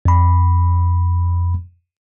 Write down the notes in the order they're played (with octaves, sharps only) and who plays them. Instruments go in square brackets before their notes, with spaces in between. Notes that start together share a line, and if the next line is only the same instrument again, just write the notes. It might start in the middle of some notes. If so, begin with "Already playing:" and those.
[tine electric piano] F2 B5